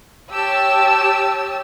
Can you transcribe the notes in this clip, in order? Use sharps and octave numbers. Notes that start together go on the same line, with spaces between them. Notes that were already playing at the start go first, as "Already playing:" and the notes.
G4 C#5 A5 E6